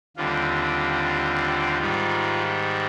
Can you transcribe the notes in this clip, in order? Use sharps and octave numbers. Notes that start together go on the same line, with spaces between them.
D#2 D3 G3 C4 F4
G#2 D#3 G3